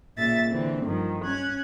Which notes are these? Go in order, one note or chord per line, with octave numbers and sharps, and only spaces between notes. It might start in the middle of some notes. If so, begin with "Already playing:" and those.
A#2 C#3 E5 A6
D3 E3 C4
G2 D#3 F3
C#4 F#6 G#6